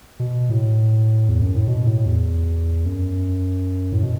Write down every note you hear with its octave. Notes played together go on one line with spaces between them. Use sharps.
B2
A2
E2
F#2
A2
B2
A2
E2
F#2
A2
B2